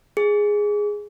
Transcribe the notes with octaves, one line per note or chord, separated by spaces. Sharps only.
G#4